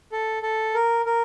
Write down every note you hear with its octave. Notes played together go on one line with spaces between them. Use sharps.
A4
A4
A#4
A#4